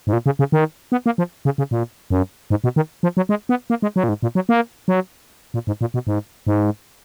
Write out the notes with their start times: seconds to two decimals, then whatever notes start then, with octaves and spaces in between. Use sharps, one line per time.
0.07 G#2
0.13 A#2
0.26 C#3
0.39 C#3
0.52 D#3
0.92 B3
1.06 A#3
1.18 F3
1.45 C#3
1.58 C#3
1.71 A#2
2.10 F#2
2.50 G#2
2.64 B2
2.76 D#3
3.03 F3
3.17 F#3
3.29 G#3
3.49 B3
3.70 A#3
3.82 G#3
3.96 F#3
4.04 A#2
4.09 G#2
4.23 A#2
4.35 F#3
4.49 A#3
4.88 F#3
5.54 A#2
5.67 G#2
5.81 A#2
5.94 B2
6.07 G#2
6.47 G#2